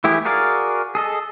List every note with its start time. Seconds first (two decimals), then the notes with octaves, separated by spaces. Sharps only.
0.04 E3 A3 E4 G4 G#4
0.25 F#4 G#4 A#4 D5 F5
0.95 G#4 A4 D#5